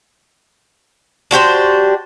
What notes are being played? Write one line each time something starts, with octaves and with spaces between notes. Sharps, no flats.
D4 F#4 G4 C5